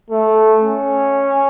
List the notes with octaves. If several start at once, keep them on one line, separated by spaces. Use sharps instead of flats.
A3
C#4